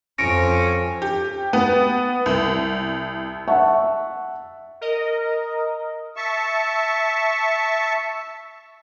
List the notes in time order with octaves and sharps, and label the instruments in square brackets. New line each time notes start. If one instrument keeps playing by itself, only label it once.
[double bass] F2 [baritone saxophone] C#4 [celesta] A#6 C#7 D7
[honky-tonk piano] G4
B3
C2
[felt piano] E5 F#5 A5 C#6
[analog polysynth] A#4 D#5
[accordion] E5 A5 C#6